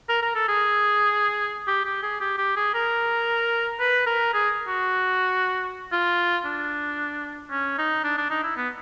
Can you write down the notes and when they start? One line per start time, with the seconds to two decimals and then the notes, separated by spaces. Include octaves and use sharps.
0.09 A#4
0.22 A#4
0.35 A4
0.48 G#4
1.67 G4
1.85 G4
2.03 G#4
2.21 G4
2.38 G4
2.56 G#4
2.74 A#4
3.80 B4
4.06 A#4
4.33 G#4
4.68 F#4
5.92 F4
6.45 D4
7.51 C#4
7.78 D#4
8.04 D4
8.18 D4
8.31 D#4
8.44 E4
8.57 B3